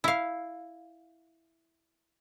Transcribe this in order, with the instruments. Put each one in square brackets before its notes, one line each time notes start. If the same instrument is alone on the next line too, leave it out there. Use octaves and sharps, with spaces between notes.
[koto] E4 F5